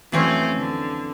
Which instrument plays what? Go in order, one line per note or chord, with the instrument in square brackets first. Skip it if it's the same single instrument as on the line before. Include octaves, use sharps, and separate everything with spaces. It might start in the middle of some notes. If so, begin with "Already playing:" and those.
[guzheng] F2 E3 F#3 [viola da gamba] A3 C4 C#4
[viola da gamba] D3